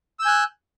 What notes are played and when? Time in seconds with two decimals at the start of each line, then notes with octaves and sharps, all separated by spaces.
0.19 E6
0.22 G6
0.25 G#5
0.28 F#6